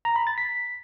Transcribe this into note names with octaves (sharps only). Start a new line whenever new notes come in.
A#5
B5
A6
B6